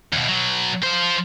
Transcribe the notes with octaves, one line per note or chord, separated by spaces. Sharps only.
D#2 B2
B2 F#3
F3 C5